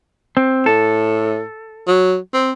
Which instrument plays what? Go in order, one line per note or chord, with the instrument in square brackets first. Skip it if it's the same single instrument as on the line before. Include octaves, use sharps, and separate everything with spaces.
[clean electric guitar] C4
[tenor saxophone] A2 [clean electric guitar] A4
[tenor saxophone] F#3
C4